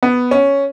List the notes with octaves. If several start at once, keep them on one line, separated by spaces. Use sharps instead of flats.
B3
C#4